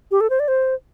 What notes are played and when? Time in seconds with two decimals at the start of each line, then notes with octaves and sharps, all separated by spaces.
0.11 G4
0.21 A4
0.30 C5
0.40 D5
0.48 C5